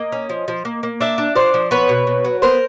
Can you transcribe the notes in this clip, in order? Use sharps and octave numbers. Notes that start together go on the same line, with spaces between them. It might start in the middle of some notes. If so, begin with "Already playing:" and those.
Already playing: A#3 D#5
C#4
F3
F3
A#3
A#3
D4 D5 E5
D4
F3 C5 D5
F3
B3 B4 C#5
B2
B2
F#3
B3 A#4 C5